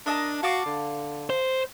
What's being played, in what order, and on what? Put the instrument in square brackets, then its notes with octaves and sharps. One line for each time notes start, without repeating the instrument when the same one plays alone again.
[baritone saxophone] D4 [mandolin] A#4 D#5 A5
[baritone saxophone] F#4 [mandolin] F5 A5 D6
[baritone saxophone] D3
[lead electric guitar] C5